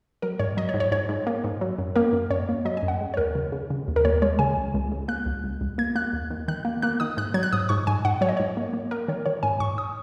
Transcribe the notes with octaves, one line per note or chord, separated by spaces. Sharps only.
F#3 A#4
G#2 C#5
F#3 D#5
C#5
G#2
C#5
G#2 C#5
G#2
A#3
G#2
F#3
F#2
A#3 A#4
F#2
F#2 C#5
A#3
F#3 D#5
G#5
F#2
F#5
G#3
C#5
D#2 A#4
C#3
C#3
C#3
D#2
A#4
D#2 C#5
G#3 C#5
C#3 G#5
C#2
C#2
C#3
A#3 F#6
C#2
C#2
C#2
A#3 G#6
A#3 F#6
D#2
D#2
D#3 F#6
A#3
A#3 F#6
D#3 D#6
G#2 F#6
F#3 G#6
F#6
G#2 D#6
G#2 C#6
G#2 G#5
G#2 F#5
F#3 C#5
D#5
G#2 C#5
A#3
A#3
A#3 A#4
D#3 C#5
D#3 C#5
G#2 G#5
G#2 C#6
D#6